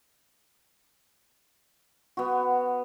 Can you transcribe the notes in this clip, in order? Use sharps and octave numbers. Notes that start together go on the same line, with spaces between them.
B3 F#4